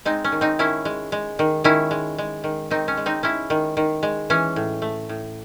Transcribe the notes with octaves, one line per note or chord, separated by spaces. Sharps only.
G#3 C4 D#4
C#4
D#3
C4 D#4
D#3 C#4 E4
G#3
G#3
D#3
D#3 C#4 E4
G#3
G#3
D#3
D#3 C4 D#4
C#4
G#3
C4 D#4
G#3 C#4 E4
D#3
D#3
G#3
E3 C#4
A2
A3
A2